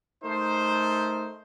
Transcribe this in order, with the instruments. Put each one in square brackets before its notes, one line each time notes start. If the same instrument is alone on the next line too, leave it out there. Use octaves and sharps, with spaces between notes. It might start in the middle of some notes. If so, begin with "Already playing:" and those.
[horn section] A3 D#4 A#4 C5